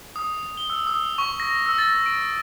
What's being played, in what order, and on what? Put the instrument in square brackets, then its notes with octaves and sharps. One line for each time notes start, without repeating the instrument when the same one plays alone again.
[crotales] D#6
G7
E6
D#6
C#6
A#6
E6
A6
D7